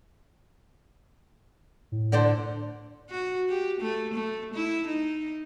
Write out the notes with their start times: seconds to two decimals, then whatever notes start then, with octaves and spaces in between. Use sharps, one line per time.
1.92 A2
2.12 D3 D4 C5
3.10 F#4
3.49 G4
3.81 A3
4.14 A3
4.55 E4
4.88 D#4